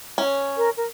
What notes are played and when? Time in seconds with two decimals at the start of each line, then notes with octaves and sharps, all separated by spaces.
0.18 C#4
0.57 A#4
0.77 A#4